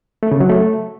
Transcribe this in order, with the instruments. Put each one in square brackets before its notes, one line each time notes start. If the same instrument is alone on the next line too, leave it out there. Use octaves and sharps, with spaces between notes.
[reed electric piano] A3
C#3
F#3
A3